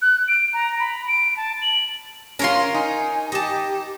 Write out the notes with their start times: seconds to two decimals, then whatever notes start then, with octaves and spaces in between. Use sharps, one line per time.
0.02 F#6
0.28 D7
0.53 A#5
0.80 B5
1.08 D7
1.37 A5
1.62 F#7
2.39 C#4 F4 A#4 C#5 C6
2.74 D#4 G#5
3.32 G4 D#5 A5